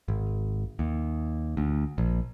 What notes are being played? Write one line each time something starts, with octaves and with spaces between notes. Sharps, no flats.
G#1
D#2
D2
A#1